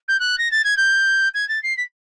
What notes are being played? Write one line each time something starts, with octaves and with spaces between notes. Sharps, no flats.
G6
F#6
A#6
A6
G#6
G6
G#6
A6
C7
B6